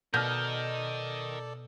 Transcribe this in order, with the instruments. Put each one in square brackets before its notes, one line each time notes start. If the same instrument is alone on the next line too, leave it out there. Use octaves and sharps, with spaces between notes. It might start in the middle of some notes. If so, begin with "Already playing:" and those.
[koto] B2 [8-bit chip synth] A4 D5 [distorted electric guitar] A#4 D#5 [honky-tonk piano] F6 G6